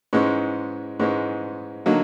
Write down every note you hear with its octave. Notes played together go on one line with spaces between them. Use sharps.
G#2 E3 G#3 C#4
G#2 E3 G#3 C#4
D3 F#3 A#3 D#4